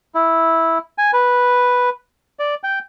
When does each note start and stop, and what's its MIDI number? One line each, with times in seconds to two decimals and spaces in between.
0.15 0.78 64
0.98 1.11 80
1.13 1.89 71
2.39 2.55 74
2.64 2.79 79